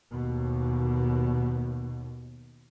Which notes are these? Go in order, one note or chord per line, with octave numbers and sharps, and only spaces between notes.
D#2 B2